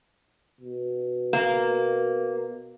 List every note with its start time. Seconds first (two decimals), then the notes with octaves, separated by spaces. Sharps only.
0.61 B2
1.33 A#3